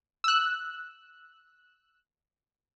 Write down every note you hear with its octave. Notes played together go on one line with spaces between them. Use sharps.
E6 F#6